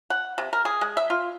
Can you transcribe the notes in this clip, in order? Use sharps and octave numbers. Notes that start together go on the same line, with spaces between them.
F#5
C3
A#4
G#4
G#3
E5
F4